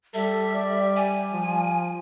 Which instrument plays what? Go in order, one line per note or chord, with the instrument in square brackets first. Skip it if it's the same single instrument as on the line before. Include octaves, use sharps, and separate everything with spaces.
[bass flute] G3 [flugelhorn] A4 [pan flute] E5
[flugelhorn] D5
[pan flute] G#5
[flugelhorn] F3